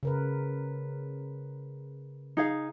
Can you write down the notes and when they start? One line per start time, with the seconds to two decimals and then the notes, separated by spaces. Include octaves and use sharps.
0.03 C#3 A#4 B4
2.37 D#4 G#4 F5